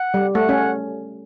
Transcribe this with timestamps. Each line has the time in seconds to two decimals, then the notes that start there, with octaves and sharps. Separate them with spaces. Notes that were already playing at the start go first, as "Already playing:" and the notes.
Already playing: F#5
0.14 G3
0.34 A3 F#5
0.49 C#4